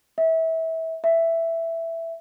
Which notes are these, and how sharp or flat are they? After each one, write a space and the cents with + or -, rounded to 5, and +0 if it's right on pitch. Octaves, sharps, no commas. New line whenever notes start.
E5 -25
E5 +5